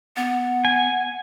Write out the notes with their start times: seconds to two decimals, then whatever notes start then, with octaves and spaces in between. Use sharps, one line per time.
0.16 B3 F#5
0.65 G#5